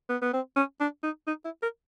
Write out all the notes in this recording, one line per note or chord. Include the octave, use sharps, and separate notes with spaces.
B3
B3
C4
C#4
D4
D#4
D#4
E4
A#4